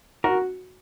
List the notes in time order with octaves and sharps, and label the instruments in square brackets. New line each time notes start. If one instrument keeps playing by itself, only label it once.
[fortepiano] F#4 [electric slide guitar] A#4